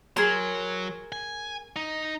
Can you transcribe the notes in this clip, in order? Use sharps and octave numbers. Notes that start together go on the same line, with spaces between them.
F#3 G#4 A#4 C6
G#5
D#4